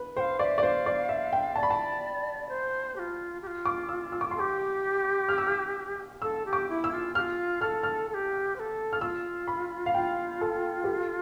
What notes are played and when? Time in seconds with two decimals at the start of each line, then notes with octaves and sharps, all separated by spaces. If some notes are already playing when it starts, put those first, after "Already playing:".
Already playing: B4
0.16 C5 F5 G5
0.39 D5 E5 F5
0.58 D5
0.62 C5 F5
0.86 D5
1.09 E5
1.33 G5
1.56 D5 A5
1.63 B5
1.71 A5
2.49 C5
2.95 G4
2.99 F4
3.42 G4
3.47 F4
3.66 D6
3.89 E6
4.12 E6
4.21 D6
4.31 C6
4.36 A4
4.39 G4 D6
5.29 F6
5.38 E6
5.47 F6
6.22 A4 E6
6.45 G4
6.53 D6
6.68 E4
6.84 E6
6.91 F4
7.15 F4 G4 F6
7.61 A4 F6
7.83 F6
8.09 A4
8.14 G4
8.55 C5
8.59 A4
8.93 F6
9.01 F4 E6
9.47 B5
9.86 F5
9.94 F4 G5
10.41 A4
10.84 G4
10.87 A4